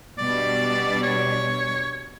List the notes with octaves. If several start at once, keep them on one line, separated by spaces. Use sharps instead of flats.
B2 G3 D4 D5
C#5